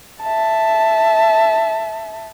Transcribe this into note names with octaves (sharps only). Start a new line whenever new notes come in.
E5 A5